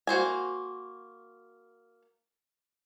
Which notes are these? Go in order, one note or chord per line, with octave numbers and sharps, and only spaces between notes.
A#3 F#4 C5 G#5